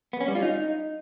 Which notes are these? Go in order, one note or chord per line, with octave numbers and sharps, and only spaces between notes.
B3
C#4
G3
F4
D#4